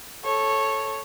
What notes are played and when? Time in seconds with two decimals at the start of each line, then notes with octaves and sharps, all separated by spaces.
0.24 A4 C#5